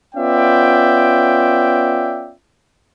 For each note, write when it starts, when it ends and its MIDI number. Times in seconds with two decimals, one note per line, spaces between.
0.15 2.33 59
0.15 2.33 61
0.15 2.33 65
0.15 2.33 74
0.15 2.33 76
0.15 2.33 79